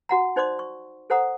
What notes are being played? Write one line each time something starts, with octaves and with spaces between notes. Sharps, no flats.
F#4 F#5 A#5
D#4 C5 D5 C6 D6
C#6
A4 C5 F#5 A#5 D#6